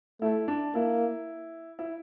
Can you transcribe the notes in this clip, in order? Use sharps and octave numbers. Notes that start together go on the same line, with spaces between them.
A3 E4
D4
A#3 E4
E4